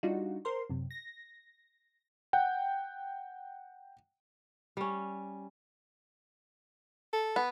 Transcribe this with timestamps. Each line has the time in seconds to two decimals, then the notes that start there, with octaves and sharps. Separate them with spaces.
0.03 G3 D4 D#4 F4 F#4
0.45 A#4 C5 C6
0.69 F#2 C3
0.91 A#6
2.33 F#5 G5
4.77 G3 C#4
7.13 A4
7.36 B3